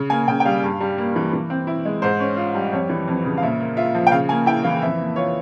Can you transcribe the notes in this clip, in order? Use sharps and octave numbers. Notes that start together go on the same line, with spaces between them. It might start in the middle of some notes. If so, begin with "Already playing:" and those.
Already playing: C#3
A#3 G#5
C#3 G5
G5
G3 F5
G2
G3
A#3
E3
E3
C4
E4
G#3
G#2 C5
C#4
F4
G3
F2 C#5
E3
F2
C#3
F5
A#2 E5
A#3
F4 E5
F3
G5
C#3 F5
A#3 G#5
E4 G5
E3 F5
F2 E5
A#3
F4 C#5